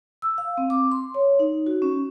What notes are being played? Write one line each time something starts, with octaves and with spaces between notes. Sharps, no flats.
E6
F5
C4
D6
C6
C#5
D#4
F#4
C#4